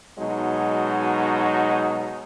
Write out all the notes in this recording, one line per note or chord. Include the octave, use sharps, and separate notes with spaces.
B2 F#3 G#3 D#4